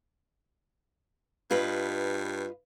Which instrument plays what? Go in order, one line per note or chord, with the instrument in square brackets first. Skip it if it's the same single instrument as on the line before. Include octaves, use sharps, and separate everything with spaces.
[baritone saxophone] G2 [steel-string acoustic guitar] F4 B4 D#5